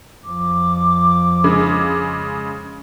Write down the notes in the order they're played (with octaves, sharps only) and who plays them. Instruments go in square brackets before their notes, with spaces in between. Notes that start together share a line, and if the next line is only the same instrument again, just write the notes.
[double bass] F2 F3 [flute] D6
[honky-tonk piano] C#3 G#3